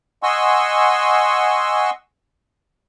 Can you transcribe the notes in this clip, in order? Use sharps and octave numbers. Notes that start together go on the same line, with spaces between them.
D#5 F#5 G#5 C6 C#6 E6